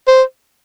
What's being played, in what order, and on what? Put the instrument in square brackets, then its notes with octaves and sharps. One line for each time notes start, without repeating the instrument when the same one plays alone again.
[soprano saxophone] C5